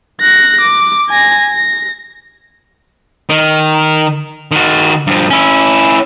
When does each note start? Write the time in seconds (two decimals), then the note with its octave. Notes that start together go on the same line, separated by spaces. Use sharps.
0.21 F#6 A#6
0.62 D6
1.10 G#5 A#6
1.50 A#6
3.29 D#3
4.51 D#3 F#4
5.07 G2 F3
5.30 C#4 E4